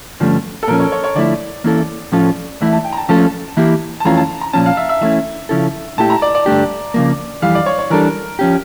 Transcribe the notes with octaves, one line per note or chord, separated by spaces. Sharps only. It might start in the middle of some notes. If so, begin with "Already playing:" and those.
G2 D3 F3 A3 C#4
A4
A#2 F3 C#4 A#4
C#5
C#5
C#5
D3 F3 A3 E4 D5
E3 A#3 C#4 E4 A4
A2 F3 C#4 F4 A4
E2 E3 A3 E4 E5
A5
G5
A#5
A5
F3 A3 C#4 F4 A4 A5
E3 A#3 E4 G4
A5
F2 E3 A3 C#4 F4 A#5
A5
A#5
A#2 F3 C#4 A5
F5
E5
E5
E3 A3 C#4 E4 E5
C#3 F3 C#4 E4 A4
A#2 A3 E4 G4 A5
A#5
D5
D5
G2 D3 A3 D4 G4
C#3 F3 A#3
F2 E3 G3 F5
D5
C#5
C#5
E3 G3 D4 A4 A#4
F3 C#4 G4